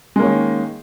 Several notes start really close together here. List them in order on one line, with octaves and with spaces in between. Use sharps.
G#3 A#3 C#4 D#3